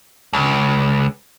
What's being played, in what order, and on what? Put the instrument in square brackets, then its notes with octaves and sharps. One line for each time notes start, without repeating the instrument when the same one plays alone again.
[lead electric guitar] C#2